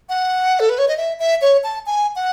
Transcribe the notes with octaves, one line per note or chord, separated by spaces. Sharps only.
F#5
A4
B4
C#5
D#5
E5
E5
C#5
A5
G#5
F#5